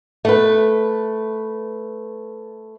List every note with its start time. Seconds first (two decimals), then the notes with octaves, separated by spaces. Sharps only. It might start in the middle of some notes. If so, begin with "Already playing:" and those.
0.25 A3 B4